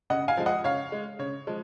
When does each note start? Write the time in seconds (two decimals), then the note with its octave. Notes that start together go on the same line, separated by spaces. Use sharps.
0.10 C#3 D#5 F#5
0.28 F5 G#5
0.37 F3 G#3
0.46 D#5 F#5
0.64 C#3 C#5 F5
0.92 G#3
1.19 C#3 C#5
1.47 F3 G#3